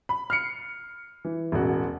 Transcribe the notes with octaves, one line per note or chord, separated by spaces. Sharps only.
B5
F6 C7 C#7
E3
E1 A1 F#4